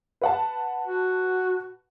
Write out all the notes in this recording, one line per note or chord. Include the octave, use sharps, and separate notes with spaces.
B4 F#5 A5
F#4